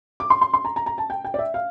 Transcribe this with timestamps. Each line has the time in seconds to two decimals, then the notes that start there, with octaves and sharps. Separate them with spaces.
0.20 D6
0.30 C6
0.42 C6
0.54 C6
0.65 A#5
0.76 A#5
0.86 A#5
0.98 A5
1.10 G5
1.24 G5
1.34 D5
1.39 E5
1.54 F5